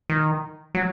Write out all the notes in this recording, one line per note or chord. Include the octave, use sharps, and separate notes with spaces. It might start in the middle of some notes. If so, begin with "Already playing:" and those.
D#3
F#3